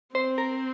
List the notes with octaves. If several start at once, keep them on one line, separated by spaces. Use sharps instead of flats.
C4 C5
A#4